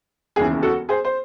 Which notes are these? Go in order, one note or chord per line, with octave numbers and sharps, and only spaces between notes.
E1 D#2 C#3 E3 G#4
F#4 A4
G#4 C5
C5